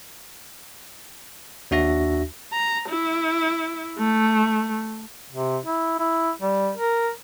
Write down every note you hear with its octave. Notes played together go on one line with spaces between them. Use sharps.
D#2 D4 F#4 E5 A#6
A#5
E4
A3
C3
E4
E4
G3
A#4